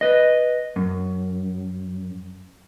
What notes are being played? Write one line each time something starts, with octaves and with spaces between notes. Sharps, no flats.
B4 D#5
F#2